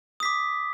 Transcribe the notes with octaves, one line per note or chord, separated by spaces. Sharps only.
D6 D#6 B6